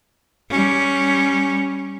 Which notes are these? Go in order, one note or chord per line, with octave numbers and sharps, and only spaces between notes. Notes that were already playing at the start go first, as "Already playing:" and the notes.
G3 C#4